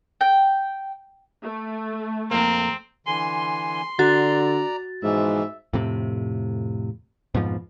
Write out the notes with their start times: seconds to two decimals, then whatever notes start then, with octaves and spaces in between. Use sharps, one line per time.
0.21 G5
1.43 A3
2.31 F2 A#3 C4 A#5
3.06 D3 E3 G#5 C6
3.99 D3 F#4 D5 A#5 A6
5.03 G#2 B2 E3 F3 E5
5.73 F2 A2 C3
7.34 F2 G#2 B2 F3